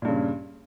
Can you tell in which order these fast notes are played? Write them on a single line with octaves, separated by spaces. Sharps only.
A#2 G2 C#3